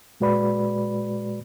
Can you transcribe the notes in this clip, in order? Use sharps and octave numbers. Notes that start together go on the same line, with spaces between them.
A#2 G#3 F#4 B4 D5 B5